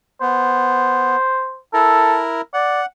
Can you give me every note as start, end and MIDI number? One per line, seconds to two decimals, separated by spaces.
0.21 1.16 59
0.21 1.60 72
1.74 2.41 64
1.74 2.22 69
1.74 2.41 70
2.54 2.82 74
2.54 2.86 78